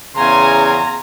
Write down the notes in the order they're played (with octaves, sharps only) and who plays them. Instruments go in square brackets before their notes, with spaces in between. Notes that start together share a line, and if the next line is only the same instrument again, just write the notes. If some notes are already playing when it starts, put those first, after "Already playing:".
[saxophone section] E2 C#3 [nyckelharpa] G#5 C6 [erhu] A#5